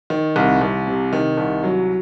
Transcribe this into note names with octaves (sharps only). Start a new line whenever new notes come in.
D#3
C2
C2
C3
D#3
C2
F#3